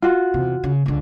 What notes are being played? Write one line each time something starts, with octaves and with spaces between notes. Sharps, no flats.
F4 F#4
E2 C3
C#3
C#2 D3